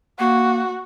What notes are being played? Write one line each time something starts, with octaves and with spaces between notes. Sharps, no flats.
A#3 F#4